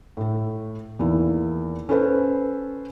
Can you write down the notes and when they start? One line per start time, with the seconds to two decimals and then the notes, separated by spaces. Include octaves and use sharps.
0.17 A2 A3
0.99 E2 D#3 A#3 E4
1.89 C#4 A4 B4 C5